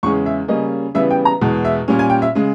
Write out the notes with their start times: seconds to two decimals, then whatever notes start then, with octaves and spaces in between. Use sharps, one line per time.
0.03 E2 C#3 G#3 C#4 C#6
0.26 E5
0.48 C#3 G3 A#3 C#4 D#5
0.95 C#3 E3 G3 B3 E5
1.11 G5
1.25 A#5
1.41 E2 B2 G#3
1.65 E5
1.88 A#2 G3 C#4
1.99 G#5
2.10 G5
2.22 E5
2.35 C#3 G#3